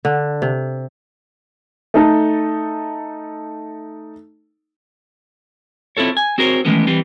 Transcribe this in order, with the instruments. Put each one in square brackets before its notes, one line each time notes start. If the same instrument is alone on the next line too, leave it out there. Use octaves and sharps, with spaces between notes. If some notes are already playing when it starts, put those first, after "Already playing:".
[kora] D3
C3
[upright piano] A3 D#4 A4
[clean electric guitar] C4 E4 F4 A4 C#5
G#5
C4 F#4 G#4 A#4 C5 C#5
D#3 E3 G#3 A3 B3 C#4
E3 G3 C4 B4